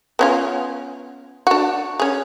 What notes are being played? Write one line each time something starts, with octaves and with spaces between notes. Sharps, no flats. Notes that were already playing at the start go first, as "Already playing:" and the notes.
B3 C#4 F4
D4 F#4
C#4 G#4